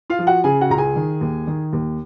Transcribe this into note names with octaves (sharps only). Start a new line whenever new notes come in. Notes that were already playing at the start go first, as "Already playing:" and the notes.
F4 F5
F3
F#4 F#5
C#3 G#4 G#5
F#4 F#5
C#2 A#5
G#4 G#5
D#3
D#2
D#3
D#2